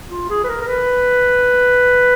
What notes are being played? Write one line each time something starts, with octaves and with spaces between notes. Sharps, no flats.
F4
G#4
B4
A#4
A#4
B4